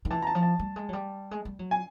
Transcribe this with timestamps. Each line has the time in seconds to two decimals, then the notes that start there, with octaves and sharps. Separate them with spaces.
0.05 D#3
0.10 E3 A5
0.22 A#5
0.27 A5
0.35 F3
0.43 A5
0.59 G3
0.76 G#3
0.89 F#3
0.93 G3
1.31 G#3
1.45 G3
1.59 F#3
1.71 G#5